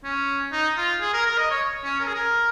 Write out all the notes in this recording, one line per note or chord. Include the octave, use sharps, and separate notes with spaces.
C#4
D#4
F4
G#4
A#4
A#4
D#5
C#5
C#4
A#4
G#4
A#4